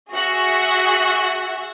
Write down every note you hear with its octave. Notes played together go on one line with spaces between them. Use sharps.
F#4 G#4 E5 F#5